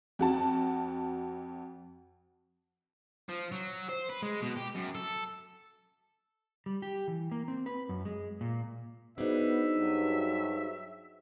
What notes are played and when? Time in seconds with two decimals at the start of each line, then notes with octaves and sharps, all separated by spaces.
0.19 F2 F#4 A5
3.29 F3
3.52 F#3
3.89 C5
4.10 B4
4.22 G#3
4.42 B2
4.57 G4
4.75 F#2
4.95 A4
6.66 G3
6.82 G4
7.08 E3
7.32 A#3
7.48 C4
7.66 B4
7.89 F#2
8.05 G#3
8.41 A#2
9.18 B3 D4 D#4 F#4 G#4 C5 E5
9.77 G2 F#3